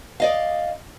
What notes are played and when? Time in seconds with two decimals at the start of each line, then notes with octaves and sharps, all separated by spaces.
0.20 D5 D#5 F5